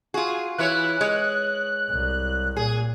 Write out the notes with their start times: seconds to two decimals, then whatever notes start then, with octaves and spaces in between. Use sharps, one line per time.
0.14 F4 F#4 G#4
0.58 E3 E4 C#5 F#6
1.01 G#3 C#5
1.90 C2
2.57 A#2 G#4